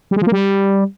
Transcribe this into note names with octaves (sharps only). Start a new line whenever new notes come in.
G3
G#3
F3
A#3
G3